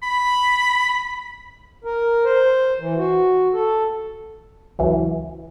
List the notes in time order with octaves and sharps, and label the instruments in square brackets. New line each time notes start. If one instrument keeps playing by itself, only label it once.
[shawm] B5
[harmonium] A#4
C5
E3
F#4
A4
[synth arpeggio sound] C#2 E3 F#3